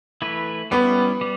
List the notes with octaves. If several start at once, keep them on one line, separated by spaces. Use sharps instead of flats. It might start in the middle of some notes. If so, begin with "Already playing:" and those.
E3 A3 E4 B4
G3 B3 C#4 E4
G3